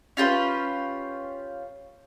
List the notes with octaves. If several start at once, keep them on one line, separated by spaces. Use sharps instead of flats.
C#4 F4 G4 B4